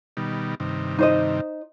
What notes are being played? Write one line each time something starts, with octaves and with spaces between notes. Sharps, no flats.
B2 D#3 G3
G2 C3 D#3
D#4 C5 D#5